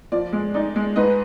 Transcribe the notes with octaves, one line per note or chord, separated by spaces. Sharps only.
F3 D5
G#3
D#4 D5
G#3
G#2 B4 D#5